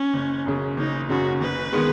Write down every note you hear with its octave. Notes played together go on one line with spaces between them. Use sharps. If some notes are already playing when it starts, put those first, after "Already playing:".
Already playing: C#4
F#1
F#2 C#3
F#1 D#4
F#2 C#3 F#4
F#1 B4
D#3 G#3 B3